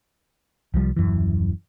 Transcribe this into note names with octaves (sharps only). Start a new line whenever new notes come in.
C2 F3 G3
D#1 F#2 E3